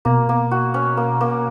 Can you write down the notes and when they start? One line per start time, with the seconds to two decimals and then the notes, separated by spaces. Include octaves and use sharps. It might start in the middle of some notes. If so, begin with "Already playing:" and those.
0.05 B2 A#3
0.29 A#3
0.51 F#4
0.74 C#4
0.97 A#3
1.21 A#3